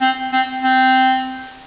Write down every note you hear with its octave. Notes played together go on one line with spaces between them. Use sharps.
C4
C4
C4